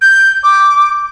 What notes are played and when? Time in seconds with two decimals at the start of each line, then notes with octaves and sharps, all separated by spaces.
0.02 G6
0.43 D6